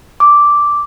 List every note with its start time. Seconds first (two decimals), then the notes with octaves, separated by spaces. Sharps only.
0.20 D6